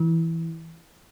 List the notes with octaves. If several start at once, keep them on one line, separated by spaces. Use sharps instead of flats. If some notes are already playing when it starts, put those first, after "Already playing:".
Already playing: E3